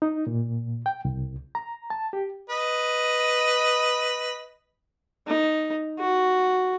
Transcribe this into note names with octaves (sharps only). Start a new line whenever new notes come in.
D#4
A#2
G5
C2
A#5
A5
G4
B4 D#5
D#4
F#4